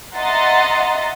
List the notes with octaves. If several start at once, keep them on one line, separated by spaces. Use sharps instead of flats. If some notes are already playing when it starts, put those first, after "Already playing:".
D#5 E5 F#5 A#5 C6 A6